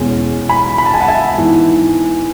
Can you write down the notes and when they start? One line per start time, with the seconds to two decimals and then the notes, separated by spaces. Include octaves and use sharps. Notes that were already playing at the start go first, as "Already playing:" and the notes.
Already playing: E2 B2 G#3 C#4
0.49 G#5 B5
0.78 B5
0.86 A5
0.94 G#5
1.00 F#5 A5
1.08 E5 G#5
1.38 G#2 E3 B3